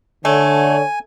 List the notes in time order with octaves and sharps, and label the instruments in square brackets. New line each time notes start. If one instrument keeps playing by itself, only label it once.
[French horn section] D3 [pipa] A3 [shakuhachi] C#5 [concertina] G#5